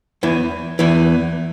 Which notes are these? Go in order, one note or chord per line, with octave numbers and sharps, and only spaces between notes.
E2 E3
E2 E3